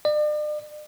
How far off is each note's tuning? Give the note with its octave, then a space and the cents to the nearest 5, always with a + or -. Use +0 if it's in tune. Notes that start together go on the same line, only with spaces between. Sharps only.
D5 +40